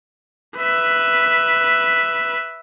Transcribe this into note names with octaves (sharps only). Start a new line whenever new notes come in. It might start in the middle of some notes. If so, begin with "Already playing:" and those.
B4 E5